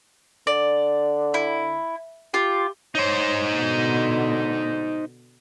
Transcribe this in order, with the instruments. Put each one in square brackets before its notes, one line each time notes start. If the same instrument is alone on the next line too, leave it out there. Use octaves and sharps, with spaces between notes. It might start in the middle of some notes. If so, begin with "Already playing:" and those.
[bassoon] D3 [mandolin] D5
[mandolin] E4
[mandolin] F4 [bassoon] G4
[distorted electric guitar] D#4 C5 [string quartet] C#5
[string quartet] B2 D3